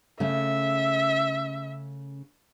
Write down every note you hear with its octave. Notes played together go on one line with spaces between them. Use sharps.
C#3 A3 C#4 E5